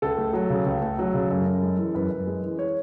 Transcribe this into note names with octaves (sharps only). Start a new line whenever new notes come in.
C#2 A4
A3
F#3
C#3
C#2
A3
F#3
C#3
F#2
F#2
G#3
E3
F#2 B4
F#2
G#3
E3
C#5